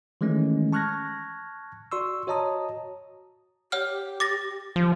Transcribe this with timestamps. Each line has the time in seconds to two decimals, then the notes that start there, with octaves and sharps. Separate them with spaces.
0.21 D#3 E3 G#3 A3 C#4
0.73 A5 C#6 F6 F#6 G#6 A#6
1.92 F#4 D5 C6 C#6 E6
2.27 F#4 C#5 D#5 A5 A#5 D#6
3.72 G4 C#5 F#5 F6
4.20 D6 A6 A#6
4.76 F3